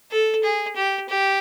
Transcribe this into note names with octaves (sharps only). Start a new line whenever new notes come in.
A4
G#4
G4
G4